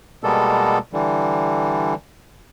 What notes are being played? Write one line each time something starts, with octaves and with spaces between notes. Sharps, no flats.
B2 G3 G#3 A#3 B3 A4
D3 E3 G3